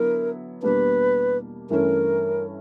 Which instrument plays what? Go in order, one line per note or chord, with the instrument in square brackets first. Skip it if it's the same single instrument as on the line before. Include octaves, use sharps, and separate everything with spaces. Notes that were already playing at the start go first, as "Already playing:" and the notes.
Already playing: [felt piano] D3 F#3 B3 E4 [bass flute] A#4
[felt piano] E2 B2 G3 A#3 D4 [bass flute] B4
[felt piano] G2 E3 A3 C#4 [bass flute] A#4